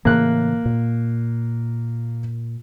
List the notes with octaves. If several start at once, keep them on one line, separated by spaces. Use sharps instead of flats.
A2 C#3 E3 A#3 F#6
A#2